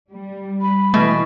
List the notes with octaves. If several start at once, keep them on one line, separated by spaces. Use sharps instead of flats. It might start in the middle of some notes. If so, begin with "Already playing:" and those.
G3
B5
B2 E3 A3